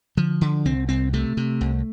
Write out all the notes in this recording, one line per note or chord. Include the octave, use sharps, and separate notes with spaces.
D3 F3
D3
C2 C4
C2 C4
C3 A3
C3
C2